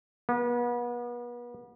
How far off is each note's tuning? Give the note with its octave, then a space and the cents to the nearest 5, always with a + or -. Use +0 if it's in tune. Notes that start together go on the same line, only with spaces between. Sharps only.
B3 -35